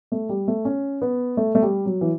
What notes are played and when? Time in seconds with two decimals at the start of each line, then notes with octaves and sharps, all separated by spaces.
0.12 A3
0.29 G3
0.48 A3
0.65 C#4
1.02 B3
1.37 A3
1.55 A3
1.62 G3
1.86 F#3
2.01 E3